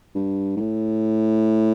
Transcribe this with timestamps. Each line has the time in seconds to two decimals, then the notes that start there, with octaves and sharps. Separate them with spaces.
0.15 G2
0.57 G#2
0.60 A2